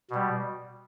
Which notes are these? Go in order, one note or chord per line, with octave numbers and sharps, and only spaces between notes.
B2 G3